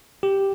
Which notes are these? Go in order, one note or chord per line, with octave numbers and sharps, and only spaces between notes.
G4